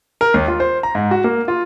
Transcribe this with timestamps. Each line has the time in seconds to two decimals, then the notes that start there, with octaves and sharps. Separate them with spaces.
0.21 A#4
0.34 D#2
0.48 F4
0.60 C5
0.83 A#5
0.95 G#2
1.11 F#4
1.24 A#3
1.48 F4